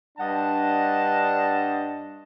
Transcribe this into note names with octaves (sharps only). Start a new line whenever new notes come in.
G2 D4 D#5 F#5 A5